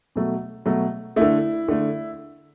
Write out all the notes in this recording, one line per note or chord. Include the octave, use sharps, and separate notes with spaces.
B2 F#3 A3
B2 F#3 A3
D3 A3 E4
D3 A3